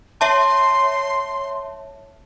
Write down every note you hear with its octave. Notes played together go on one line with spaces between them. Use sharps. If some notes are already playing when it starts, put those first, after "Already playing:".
C#5 E5 A5 C6